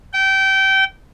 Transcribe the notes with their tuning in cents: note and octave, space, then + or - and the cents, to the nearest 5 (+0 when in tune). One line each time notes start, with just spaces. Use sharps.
G5 -25